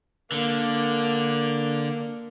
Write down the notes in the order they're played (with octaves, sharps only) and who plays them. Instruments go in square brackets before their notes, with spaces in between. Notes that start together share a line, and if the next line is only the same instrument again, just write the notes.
[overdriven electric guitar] D3 [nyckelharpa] A#3